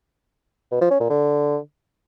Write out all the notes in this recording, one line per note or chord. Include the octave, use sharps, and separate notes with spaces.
B2
F3
C#4
A#2
D3